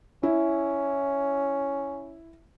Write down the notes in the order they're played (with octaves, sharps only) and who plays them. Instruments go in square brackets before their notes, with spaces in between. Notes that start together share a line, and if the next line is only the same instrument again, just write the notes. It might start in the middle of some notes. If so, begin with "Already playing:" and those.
[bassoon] C#4 [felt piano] E4